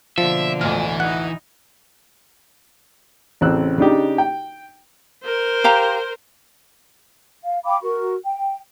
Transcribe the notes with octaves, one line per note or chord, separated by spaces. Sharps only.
B2 D3 F3 A#3 E5
A1 D2 E3 F6
D#4 E4 F#5
A1 C#3 C4 E6 F#6
C#3 D4 D#4 G4
G5
A#4 C5
G4 F5 A#5
F5
F5 G5 B5 D6
F#4 A#4 C#6
G5